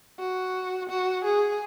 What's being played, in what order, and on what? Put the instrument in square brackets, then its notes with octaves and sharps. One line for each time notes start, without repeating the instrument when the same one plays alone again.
[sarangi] F#4
F#4
G#4